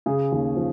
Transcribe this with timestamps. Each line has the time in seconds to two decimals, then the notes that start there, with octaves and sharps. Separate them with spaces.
0.06 C#3 G#4
0.32 D#2
0.56 F3